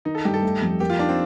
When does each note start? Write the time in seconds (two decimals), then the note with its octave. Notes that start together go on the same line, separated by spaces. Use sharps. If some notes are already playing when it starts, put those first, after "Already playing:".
0.05 D#3 D#4
0.15 A4
0.25 G2 G4
0.34 A4
0.43 A3
0.62 F2
0.80 A#3 G4
0.90 F4
0.99 D4 D#4
1.09 C4